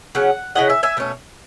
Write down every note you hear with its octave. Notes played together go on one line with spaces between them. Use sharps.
C#3 F#3 C#4 F#5
C#3 F#3 C#4 E4 D#5 F#5
E5 G#5
E5 G#5
B2 A3 C#4